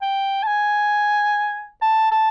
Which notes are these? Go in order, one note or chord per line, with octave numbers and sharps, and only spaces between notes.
G5
A5
G#5
A5
A5